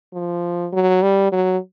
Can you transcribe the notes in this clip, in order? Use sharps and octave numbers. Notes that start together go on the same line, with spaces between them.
F3
F#3
G3
F#3